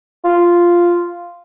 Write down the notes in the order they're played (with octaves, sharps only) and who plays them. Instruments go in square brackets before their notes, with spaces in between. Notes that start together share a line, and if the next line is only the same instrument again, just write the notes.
[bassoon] F4